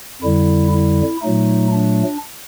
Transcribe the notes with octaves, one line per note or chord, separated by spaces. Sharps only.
F2 D3 G3 E4
E4
A#2 F#3 A3 D#4
D4